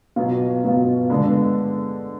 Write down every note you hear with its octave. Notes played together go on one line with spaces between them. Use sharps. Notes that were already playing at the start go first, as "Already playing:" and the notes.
B2 F#3 B3 F4
B2 F#3 B3 F4
D3 G#3 B3 D4